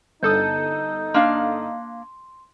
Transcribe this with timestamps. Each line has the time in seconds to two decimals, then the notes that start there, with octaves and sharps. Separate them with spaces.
0.23 G1 D#4 A4 D#6 G6
1.14 A#3 D4 F5 C6